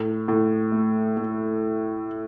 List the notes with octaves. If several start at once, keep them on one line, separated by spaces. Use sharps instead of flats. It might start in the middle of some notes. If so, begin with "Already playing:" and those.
Already playing: A2
A2
A3
A3